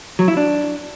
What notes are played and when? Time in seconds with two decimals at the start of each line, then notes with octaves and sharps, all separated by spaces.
0.19 F#3
0.28 E4
0.37 D4